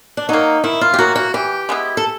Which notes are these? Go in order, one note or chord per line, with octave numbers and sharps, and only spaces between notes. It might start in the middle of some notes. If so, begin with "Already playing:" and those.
D4
F#3 A#3 D#4
D#3 E4
F4
G4
F#3 A#3 F#4
F#4
E3 G4
G#3 B3 E4
A4